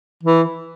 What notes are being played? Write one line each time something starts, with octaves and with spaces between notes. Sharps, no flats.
E3